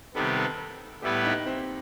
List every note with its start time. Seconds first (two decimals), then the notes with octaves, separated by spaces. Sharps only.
0.14 C3 D#3 G3 B3 A4
0.37 A4
1.02 A2 G3 B3 E4 G4 B4
1.25 D#4
1.46 C4